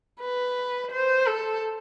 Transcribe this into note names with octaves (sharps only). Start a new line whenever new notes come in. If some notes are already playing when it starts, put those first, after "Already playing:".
B4
C5
A4